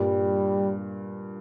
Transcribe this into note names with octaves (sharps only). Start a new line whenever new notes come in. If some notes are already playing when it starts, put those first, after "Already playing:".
Already playing: G2 A#2 G3